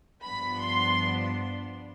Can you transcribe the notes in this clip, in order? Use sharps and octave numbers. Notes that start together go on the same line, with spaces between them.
G2 F3 B3 D4 B5
C6